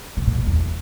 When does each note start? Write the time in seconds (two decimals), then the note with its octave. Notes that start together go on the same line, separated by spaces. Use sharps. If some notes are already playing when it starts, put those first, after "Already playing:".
0.17 C#3
0.27 A#2
0.37 F2
0.47 E2